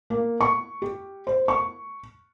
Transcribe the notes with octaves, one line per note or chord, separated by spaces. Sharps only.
A#3
C#6
G4
C5
C#6